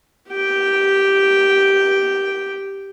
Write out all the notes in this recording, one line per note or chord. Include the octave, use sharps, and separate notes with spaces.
G4 G5